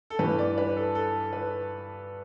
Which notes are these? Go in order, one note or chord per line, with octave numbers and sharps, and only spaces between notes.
A4
G2 E3 B4
D5
B4
A4
A4
B4